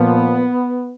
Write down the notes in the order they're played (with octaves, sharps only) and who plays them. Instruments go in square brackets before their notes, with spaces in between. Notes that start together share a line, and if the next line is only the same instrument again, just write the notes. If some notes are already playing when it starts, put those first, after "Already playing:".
Already playing: [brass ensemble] A#2 F3 B3